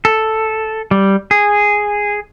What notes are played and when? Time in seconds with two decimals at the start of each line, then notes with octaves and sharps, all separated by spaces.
0.05 A4
0.91 G3
1.31 G#4